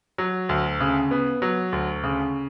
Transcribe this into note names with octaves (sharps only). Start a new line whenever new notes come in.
F#3
D2
C#3
B3
F#3
D2
C#3